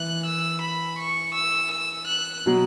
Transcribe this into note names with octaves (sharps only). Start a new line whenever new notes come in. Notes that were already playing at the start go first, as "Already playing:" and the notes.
Already playing: E3 F#6
E6
B5
C#6
E6
E6
F#6
B2 F#3